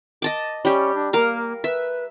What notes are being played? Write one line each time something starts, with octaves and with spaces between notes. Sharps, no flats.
D#5 A5 D6
G3 C#4 G4
D4
A#3 A#4 F5
B4 E5